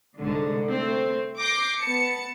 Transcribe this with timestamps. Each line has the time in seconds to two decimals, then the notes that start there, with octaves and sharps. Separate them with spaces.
0.18 C2 G#2 D3
0.67 A3 C4
1.39 D6 G6 A#6 C7
1.80 B3 A5 C#7